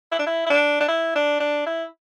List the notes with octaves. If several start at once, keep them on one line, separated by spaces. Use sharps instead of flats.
E4
D4
E4
E4
D4
D4
E4
D4
D4
E4